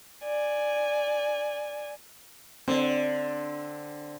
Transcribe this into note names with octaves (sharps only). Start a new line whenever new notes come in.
D5 G#5
D3 C4